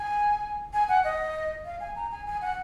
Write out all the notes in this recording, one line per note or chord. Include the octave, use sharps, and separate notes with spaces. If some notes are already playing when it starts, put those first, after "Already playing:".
Already playing: G#5
G#5
F#5
D#5
F5
G#5
A#5
G#5
G#5
F#5